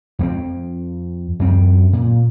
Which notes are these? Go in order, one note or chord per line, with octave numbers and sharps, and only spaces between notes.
F2 A#3 C4
F#2 C4
A#2